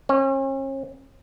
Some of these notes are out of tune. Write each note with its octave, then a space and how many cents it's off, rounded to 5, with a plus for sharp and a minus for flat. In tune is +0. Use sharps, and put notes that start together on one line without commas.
C#4 -40